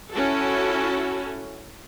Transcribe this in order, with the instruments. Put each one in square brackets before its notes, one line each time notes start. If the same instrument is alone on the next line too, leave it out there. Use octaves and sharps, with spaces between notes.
[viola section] C#4 E4 F#4 A4